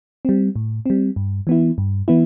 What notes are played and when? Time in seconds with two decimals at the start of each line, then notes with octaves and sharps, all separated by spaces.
0.25 G3 C4
0.56 A2
0.86 G3 C4
1.16 G2
1.47 E3 B3 E4
1.78 G2
2.08 E3 B3 E4